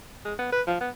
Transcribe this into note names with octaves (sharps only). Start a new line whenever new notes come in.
G#3
B3
B4
F3
B3